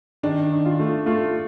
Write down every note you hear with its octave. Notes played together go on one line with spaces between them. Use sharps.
D#3 D4
D#3
F4
A3
A3 F4